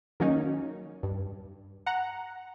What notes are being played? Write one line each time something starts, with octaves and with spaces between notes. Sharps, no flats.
D#3 F#3 A#3 C#4 D#4
G2
F#5 A#5